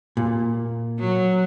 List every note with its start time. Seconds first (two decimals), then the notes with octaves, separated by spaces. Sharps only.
0.17 A#2
1.00 F#3